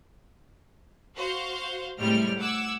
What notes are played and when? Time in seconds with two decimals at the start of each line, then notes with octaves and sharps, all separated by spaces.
1.17 F#4 C5 F5 F#5
1.99 A2 C3 G3 G#3 G5 F6
2.38 F#5 D6 E6 G#6